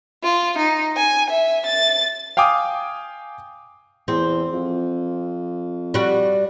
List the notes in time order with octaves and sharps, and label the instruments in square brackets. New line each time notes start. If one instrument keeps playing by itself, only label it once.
[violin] F4
D#4
G#5
E5
A6
[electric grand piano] F5 G5 G#5 D6 D#6
[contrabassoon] E2 [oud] C4
[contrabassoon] F2
[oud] G3 F#4